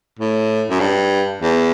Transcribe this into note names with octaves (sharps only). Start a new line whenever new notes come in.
A2
F#2
G2
E2